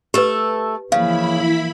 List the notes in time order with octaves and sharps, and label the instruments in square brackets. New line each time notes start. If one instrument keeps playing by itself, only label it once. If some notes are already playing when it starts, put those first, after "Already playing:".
[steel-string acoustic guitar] A3 A4 [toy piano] G4 B4
[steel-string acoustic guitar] C#3 [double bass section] E3 F3 A#3 [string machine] E4 B5 [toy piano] F5